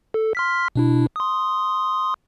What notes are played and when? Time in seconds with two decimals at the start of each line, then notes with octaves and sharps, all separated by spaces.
0.14 A4
0.35 C6 F6 B6
0.76 B2 D4 E4
1.16 C6 D#6